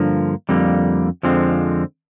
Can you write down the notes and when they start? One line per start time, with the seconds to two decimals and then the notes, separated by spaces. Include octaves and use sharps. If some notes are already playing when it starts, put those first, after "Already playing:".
Already playing: G2 D3 F3 A#3
0.49 F2 D3 G3 A#3
1.23 F2 D3 F3 G#3 C4